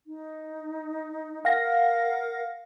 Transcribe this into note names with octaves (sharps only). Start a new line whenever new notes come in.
D#4
A#4 F5 F#5 A#6